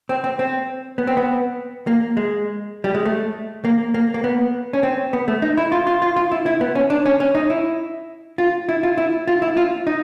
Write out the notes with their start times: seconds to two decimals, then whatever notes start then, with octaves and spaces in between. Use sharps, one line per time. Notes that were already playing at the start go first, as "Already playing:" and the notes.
0.09 C4
0.24 C4
0.39 C4
0.98 B3
1.07 C4
1.17 B3
1.87 A#3
2.17 G#3
2.84 G3
2.95 G#3
3.05 A3
3.65 A#3
3.94 A#3
4.14 A#3
4.24 B3
4.73 C#4
4.83 C4
5.13 B3
5.28 A3
5.42 D#4
5.57 E4
5.72 F4
5.87 F4
6.02 F4
6.16 F4
6.32 E4
6.46 E4
6.61 B3
6.75 C#4
6.90 D4
7.05 C#4
7.20 C#4
7.35 D#4
7.50 E4
8.38 F4
8.69 E4
8.83 F4
8.98 E4
9.27 F4
9.42 E4
9.57 F4
9.87 D#4